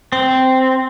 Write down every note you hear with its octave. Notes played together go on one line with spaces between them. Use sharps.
C4